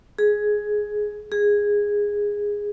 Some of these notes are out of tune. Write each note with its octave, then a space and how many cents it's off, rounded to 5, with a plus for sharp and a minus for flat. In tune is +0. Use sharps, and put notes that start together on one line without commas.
G#4 +10
G#4 -10